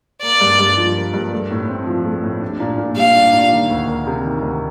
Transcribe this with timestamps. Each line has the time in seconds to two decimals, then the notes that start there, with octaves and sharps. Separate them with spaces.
0.22 A#3 D5
0.41 G2
0.59 G2
0.77 F3
0.96 A#3
1.14 G2
1.32 A3
1.51 A2
1.69 C4
1.87 F3
2.06 A3
2.23 A2
2.41 D4
2.60 A#2
2.78 A#2
2.97 G3 F5
3.15 D4
3.33 A#2
3.52 D#3
3.70 D2
3.88 A#3
4.07 C3
4.25 D#3
4.42 D2